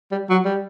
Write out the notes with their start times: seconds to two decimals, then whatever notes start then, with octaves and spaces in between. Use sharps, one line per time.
0.11 G3
0.30 F#3
0.45 G3